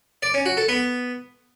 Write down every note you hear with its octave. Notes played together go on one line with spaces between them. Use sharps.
D5
C#4
F#4
A4
B3